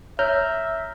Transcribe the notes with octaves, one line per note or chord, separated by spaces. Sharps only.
C#5 E5 A#5 F6 G6